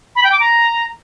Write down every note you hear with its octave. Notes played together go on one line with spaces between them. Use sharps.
B5
G5
D6
A#5